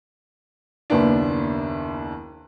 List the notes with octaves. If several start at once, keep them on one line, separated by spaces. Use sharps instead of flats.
F#1 D#2 B3 D4